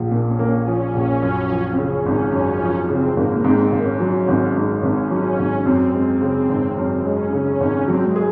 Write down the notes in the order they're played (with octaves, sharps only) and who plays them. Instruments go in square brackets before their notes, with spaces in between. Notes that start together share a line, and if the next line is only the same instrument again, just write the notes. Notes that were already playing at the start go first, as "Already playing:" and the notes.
Already playing: [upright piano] A#1 F3
[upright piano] A#2 [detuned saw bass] A#3
[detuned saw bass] C#4
[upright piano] A#3
[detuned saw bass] C#4
[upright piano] F3
A#1
F#2
F3
[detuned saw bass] C4
[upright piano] C#3 [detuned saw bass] C#4
[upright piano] G#1
F#2
F3
[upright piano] C#3 [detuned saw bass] C4
[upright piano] G#1 [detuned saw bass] A#3
[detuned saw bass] A#3
[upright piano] G#2 [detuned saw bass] C4
[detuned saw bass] C4
[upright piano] G#1 [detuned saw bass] A#3
[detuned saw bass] C#4
[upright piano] F#3 [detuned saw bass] C#4
[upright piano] G#1
G#2
[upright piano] G#1 [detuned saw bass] C#4
[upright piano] F#3
G#1
[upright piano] F#2 [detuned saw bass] C4
[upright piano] G#3 [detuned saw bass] C4
[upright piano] C#3
G#1
[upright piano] F#2 [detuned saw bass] C4
[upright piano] G#3 [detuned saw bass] C#4
[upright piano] C#3 [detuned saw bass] C#4
[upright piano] G#1
[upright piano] F#3 [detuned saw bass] C4
[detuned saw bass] G#3
[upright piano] G#4